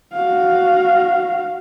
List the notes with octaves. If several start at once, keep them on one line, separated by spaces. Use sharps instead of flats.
F#4 F5